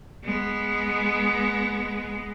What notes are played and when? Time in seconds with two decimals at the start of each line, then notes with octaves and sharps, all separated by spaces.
0.24 G#3 B3